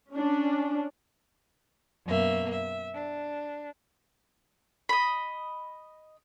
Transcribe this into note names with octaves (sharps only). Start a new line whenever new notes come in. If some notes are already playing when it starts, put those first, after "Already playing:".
C#4 D4
F#2 B2 A#3 E5
E5
D4
D#5 B5